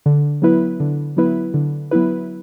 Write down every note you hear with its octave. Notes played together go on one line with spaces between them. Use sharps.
D3
F#3 B3 E4 B4
D3
F#3 B3 E4 B4
D3
F#3 B3 E4 B4